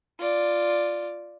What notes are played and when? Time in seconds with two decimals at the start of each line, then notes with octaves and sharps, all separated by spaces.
0.20 F4 D5